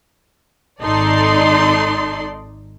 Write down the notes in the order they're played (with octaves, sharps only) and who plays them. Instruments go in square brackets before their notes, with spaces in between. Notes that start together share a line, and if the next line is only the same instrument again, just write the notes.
[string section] G#1 D#4 A4 D5 C6